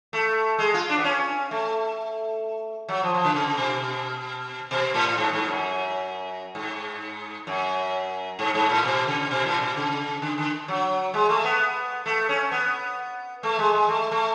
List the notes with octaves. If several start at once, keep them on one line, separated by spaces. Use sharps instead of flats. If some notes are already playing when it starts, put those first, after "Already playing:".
A3
G#3
F4
D4
B3
C#4
A3
F#3
F3
F3
D3
C#3
B2
B2
A2
G#2
G#2
F#2
G#2
F#2
G#2
G#2
A2
B2
C#3
B2
A2
B2
C#3
D3
D3
F#3
G#3
A3
B3
A3
C#4
B3
A3
G#3
G#3
A3
A3